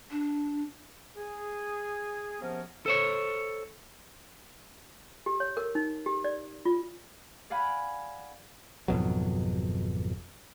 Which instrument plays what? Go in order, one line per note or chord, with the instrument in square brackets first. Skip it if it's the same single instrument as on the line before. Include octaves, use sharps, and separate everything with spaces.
[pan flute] D4
[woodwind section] G#4
C3 F3 B3 C#4 A#4
[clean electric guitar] A4 C5 C#5
[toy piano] G4
C#5
A#4
D#4
G4
D5
F4
[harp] D5 F5 F#5 G#5 B5
[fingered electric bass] G#1 F2 B2 F#3